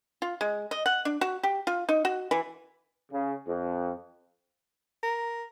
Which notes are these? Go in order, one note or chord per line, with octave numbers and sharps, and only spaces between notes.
F4
G#3
D#5
F#5
D4
F#4
G4
F4
D#4
F#4
E3
C#3
F2
A#4